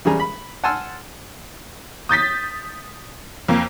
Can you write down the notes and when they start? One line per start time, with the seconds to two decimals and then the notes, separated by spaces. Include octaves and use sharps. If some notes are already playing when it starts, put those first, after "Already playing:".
0.05 E2 C#3 G3 G#4 A#5
0.20 B5
0.64 F#5 G#5 A5 C6 E6 F6
2.09 D#6 G6 A6 B6
3.48 F2 A#3